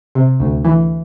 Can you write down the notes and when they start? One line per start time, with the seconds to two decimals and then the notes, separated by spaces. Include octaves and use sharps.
0.15 C3
0.40 D2
0.65 E3